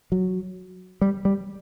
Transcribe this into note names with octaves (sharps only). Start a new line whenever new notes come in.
F#3
G3
G3